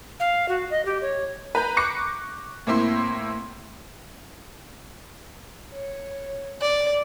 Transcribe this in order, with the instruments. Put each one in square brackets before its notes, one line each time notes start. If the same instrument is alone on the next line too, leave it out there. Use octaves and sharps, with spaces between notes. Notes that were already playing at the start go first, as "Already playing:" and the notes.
[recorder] F5
F#4
D#5
G4
C#5
[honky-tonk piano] B4 A#5 G6
C#6 D6 F#6 A#6 C#7
A2 A#3 C4 E4 C6
[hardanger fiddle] C#5
D5